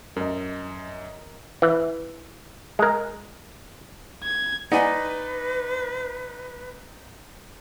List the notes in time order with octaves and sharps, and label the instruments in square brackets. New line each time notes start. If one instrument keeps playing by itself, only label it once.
[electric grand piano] F#2 [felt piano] A#4 D#5
[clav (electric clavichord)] E3
G#3 A#4
[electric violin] G#6
[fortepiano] D#4 D5 D#5 [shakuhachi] B4 [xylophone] F#5 G#5